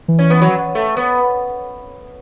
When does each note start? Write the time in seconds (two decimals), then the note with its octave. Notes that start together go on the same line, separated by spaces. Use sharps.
0.08 E3
0.19 C#4
0.30 B3
0.42 F#3
0.75 A3
0.97 B3